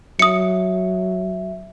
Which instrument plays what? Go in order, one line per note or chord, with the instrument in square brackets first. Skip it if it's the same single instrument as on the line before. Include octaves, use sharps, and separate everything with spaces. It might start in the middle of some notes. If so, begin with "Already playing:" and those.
[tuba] F#3 [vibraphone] E5 [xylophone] D#6 C#7